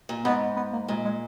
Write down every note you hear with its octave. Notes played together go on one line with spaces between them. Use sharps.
A#2
G#2 B3
B3
A#3
A#2 G#3
G#3